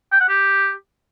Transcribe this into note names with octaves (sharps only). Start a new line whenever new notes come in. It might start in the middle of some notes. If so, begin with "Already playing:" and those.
G5
F#5
G4